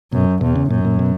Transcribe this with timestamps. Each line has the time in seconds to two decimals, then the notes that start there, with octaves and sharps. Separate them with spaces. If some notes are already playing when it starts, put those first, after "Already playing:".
0.13 F#2 B2
0.41 E2 B2
0.56 C#3
0.70 F#2 A#2
0.85 A#2
0.99 B2